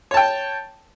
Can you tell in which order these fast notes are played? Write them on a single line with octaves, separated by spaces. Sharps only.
C#5 A5 G5